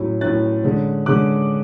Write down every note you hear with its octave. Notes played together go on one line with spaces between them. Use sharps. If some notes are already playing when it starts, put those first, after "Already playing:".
Already playing: A2 F#3 C#4
A2 F#3 C#4 F#6 A6
D3 G#3 C#4
D3 G#3 C#4 D6 F#6